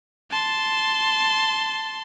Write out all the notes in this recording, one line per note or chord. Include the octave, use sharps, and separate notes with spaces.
A5 C6